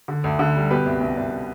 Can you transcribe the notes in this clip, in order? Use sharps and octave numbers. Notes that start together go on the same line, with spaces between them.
D3
D2
D3
G3
B2 G4 B4
C2
C2
C2